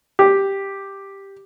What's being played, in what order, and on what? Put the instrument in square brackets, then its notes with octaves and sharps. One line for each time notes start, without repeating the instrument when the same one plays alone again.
[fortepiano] G4